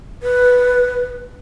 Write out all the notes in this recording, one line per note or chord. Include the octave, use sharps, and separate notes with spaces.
B4